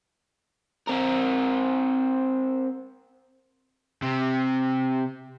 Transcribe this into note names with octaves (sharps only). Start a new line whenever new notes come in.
C4 A#4
C3